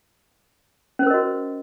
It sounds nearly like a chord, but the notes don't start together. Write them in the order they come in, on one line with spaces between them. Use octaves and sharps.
C#4 C5 A#4 D#5 F#4